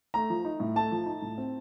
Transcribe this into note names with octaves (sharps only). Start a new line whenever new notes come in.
A3 A#5
F3
D#4
A2
A3 A5
F3
D#4
A2
C4